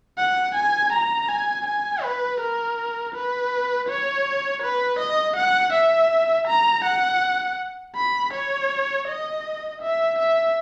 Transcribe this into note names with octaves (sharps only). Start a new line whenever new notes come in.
F#5
G#5
A#5
G#5
G#5
B4
A#4
B4
C#5
B4
D#5
F#5
E5
A#5
F#5
B5
C#5
D#5
E5
E5